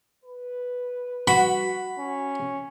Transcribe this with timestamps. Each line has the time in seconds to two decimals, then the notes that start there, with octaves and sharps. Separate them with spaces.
0.24 B4
1.28 F#4 B5
1.99 C#4